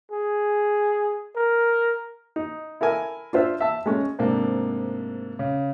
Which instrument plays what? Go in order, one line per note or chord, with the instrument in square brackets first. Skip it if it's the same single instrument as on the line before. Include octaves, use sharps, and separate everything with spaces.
[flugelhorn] G#4
A#4
[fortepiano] D#4
E4 A4 A#4 G#5
D4 F4 C5 E5
E5 A5
G#3 A3 C#4
[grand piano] G#2 C3 A3 A#3 D4
C#3